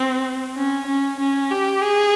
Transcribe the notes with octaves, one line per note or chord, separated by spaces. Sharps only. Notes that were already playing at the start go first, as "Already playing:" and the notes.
Already playing: C4
C#4
C#4
C#4
G4
G#4